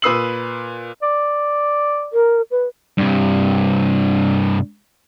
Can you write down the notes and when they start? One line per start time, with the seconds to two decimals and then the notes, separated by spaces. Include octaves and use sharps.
0.02 A#2 B4 D#6 E6 C7 F#7
1.02 D5
2.13 A#4
2.51 B4
2.98 G2 C3